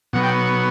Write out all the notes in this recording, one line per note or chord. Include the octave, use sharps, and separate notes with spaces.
B2 F#3 B3 F#5
G5